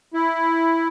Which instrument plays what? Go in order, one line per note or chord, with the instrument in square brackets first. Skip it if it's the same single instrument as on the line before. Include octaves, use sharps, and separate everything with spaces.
[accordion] E4